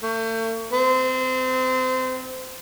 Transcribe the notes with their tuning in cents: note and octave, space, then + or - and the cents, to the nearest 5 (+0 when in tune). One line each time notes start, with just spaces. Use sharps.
A3 +40
C4 -25